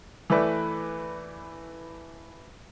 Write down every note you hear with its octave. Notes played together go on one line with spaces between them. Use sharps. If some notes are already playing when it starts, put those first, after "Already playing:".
E3 A3 E4 B4 D5